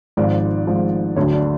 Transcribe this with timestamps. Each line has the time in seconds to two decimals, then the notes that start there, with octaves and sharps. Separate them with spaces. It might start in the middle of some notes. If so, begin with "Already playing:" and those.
0.17 G#1 G#2 F3 D5
0.67 G#1 G#2 F3
1.16 D2 D3 F#3 C#5
1.33 D4